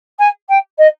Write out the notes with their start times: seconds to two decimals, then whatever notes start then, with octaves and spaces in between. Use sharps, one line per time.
0.19 G#5
0.49 G5
0.78 D#5